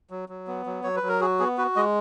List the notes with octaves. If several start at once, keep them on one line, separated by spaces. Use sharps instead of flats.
F#3
F#3
B3
F#3
F#3 C#5
B4
F#3
A#4
F#4 G#4
B3 G#4
F#4 B4
G#3 D#5